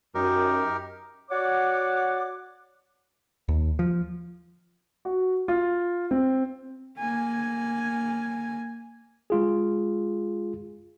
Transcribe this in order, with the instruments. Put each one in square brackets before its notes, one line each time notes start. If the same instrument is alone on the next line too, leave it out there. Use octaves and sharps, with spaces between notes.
[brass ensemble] F#2 [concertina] D#4 G4 A#4
[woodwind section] F#4 C#5 D5 F#5 D6
[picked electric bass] D#2
F3
[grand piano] F#4
F4
C4
[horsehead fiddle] A#3 G#5
[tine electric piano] G#3 F4 G#4